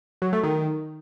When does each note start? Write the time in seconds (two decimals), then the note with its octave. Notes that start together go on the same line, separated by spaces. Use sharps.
0.22 F#3
0.33 A3
0.44 D#3